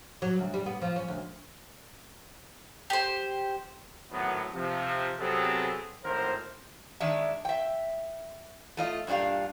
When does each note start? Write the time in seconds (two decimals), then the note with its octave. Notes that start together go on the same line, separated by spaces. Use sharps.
0.22 F#3
0.39 D2
0.54 G3
0.66 B3
0.82 F3
0.96 C#4
1.08 D2
2.90 G4 C5
4.11 G#1 A2 F#3 B3
4.54 C3 F3
5.19 C3 F#3 B3 C4 G#4 A4
6.04 G#1 A2 A#4 C5
7.00 D#3 G#3 D4 E5
7.45 E5 G5
8.77 A3 F4 D#5
9.07 G2 A#2 D4 G4 F5